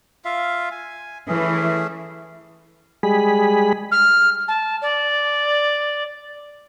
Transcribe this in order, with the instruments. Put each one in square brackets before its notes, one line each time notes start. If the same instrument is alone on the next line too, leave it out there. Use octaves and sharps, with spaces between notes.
[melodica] F4 E5 F5
G#5
[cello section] E3 [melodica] A3 C#4 G#4
[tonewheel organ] G3 G#3 G#4 B5
[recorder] F6
A5
D5